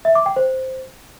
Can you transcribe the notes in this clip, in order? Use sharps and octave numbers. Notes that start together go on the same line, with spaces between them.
E5
D6
G5
C5